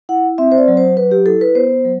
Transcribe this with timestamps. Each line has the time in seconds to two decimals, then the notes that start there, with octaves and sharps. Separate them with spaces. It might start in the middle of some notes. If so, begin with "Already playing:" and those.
0.09 E4 F#5
0.38 C4 E5
0.52 C5
0.58 D5
0.68 F#3
0.77 C5
0.97 F#3 B4
1.11 G4
1.26 E4 A4
1.41 B4
1.55 B3 C5
1.85 F#3